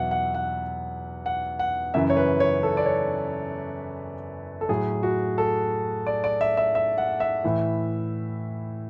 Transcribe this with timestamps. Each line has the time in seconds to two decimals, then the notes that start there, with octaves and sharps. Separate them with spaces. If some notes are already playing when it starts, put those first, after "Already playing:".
Already playing: E2 B2 F#3 E5 F#5
0.11 F#5
0.34 F#5
1.26 F#5
1.59 F#5
1.94 F#2 C#3 E3 E5
2.10 C#5
2.17 B4
2.40 C#5
2.63 A4
2.77 D5
2.86 C#5
4.61 A4
4.69 A2 F#3 G#4
5.03 F#4
5.38 A4
6.07 D5
6.24 D5
6.41 E5
6.57 E5
6.75 E5
6.98 F#5
7.20 E5
7.44 A2 E3